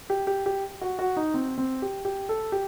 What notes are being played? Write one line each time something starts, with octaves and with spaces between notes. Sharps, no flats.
G4
G4
G4
F#4
F#4
D#4
C4
C4
G4
G4
A4
G4